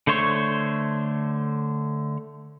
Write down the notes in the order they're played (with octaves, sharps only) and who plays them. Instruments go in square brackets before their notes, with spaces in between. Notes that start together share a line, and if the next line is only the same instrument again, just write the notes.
[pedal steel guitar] D3 A3 C5 C#5 C#6